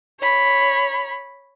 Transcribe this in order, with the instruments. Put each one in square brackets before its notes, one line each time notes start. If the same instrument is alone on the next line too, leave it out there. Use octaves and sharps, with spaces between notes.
[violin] C#5 B5